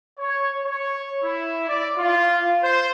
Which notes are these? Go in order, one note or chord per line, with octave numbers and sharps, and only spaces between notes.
C#5
C#5
E4
D5
F4
C5